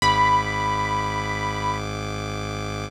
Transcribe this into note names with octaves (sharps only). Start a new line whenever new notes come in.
G#1 G#2 B5 D6